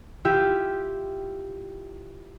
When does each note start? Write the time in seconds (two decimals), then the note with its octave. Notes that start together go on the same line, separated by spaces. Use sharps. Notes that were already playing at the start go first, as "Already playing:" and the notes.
0.25 E4 F4 G4 E5